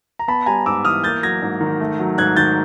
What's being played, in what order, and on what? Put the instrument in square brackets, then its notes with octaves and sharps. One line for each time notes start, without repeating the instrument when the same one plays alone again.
[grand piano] A#5
B3 A5 B5
G3 G#5 A#5
G#2 D6 E6
E3 D#6 F6
A#3 G6 A6
F#3 G#6 A#6
G#2
D#3
A3
F#3
G#2 F#6 G#6
D#3 G6 A6